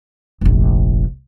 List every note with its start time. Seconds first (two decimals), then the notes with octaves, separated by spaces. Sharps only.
0.41 F1 A#1